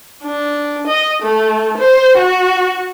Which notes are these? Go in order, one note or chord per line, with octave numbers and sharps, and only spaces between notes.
D4
D#5
A3
C5
F#4